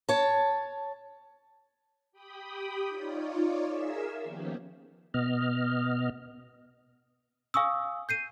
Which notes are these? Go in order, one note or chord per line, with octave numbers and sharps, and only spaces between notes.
C#5 A5
G4 G5 B5 D#6
D#4 F4 C#5 D5
G#4 A#4 E5 F5 E6
D#3 F3 A#3 B3 C#4 G4
B2 B3 D#5 F6
F5 G#5 C#6 D#6 E6
G6 C7 D#7